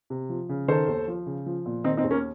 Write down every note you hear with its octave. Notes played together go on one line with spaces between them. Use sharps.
C3
F3
C#3
D#3 A4 C5
D#2
F3
C#3
F3
A#2
D#3 C4 D#4
C4 D#4
D#2
A#3 C#4